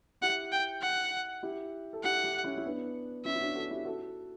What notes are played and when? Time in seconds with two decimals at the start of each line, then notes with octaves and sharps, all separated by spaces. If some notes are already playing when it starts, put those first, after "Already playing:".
0.21 E4 G4 F#5
0.52 G5
0.82 F#5
1.43 E4 G4
1.93 A4
2.03 E4 G4 F#5
2.24 E4 G4
2.44 C#4 E4
2.57 E4
2.64 B3 D4
3.25 C#4 E4 E5
3.36 E4
3.40 D4 F#4
3.55 F#4 A4
3.71 E4 G4
3.85 F#4 A4